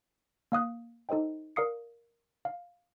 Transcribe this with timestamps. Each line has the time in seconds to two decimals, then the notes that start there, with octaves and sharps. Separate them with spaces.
0.52 A#3 F5 D#6 F#6
1.09 D#4 A4 C5 D#5 G5
1.56 A#4 D5 F5 D#6 C7 C#7
2.45 F5